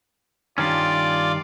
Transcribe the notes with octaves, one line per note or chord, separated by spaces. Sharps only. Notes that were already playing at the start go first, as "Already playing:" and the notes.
G2 D#3 C#4 F4 D5